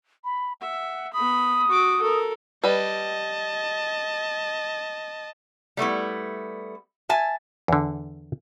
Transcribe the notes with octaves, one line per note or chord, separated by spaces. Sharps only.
B5
E5 F#5
B3 B5 D#6
F#4 D6
A4 A#4
G3 B4 D#5 A5
G3 A3 B3 E4
E5 G#5 A5
E2 D3